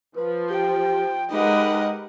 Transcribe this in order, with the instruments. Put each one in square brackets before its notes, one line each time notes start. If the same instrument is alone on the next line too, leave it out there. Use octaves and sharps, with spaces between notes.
[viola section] F3 [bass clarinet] B4
[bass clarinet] G4 [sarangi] G5
[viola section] G#3 A#4 B4 [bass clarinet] D#4 [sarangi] G4 [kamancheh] D#5 F#5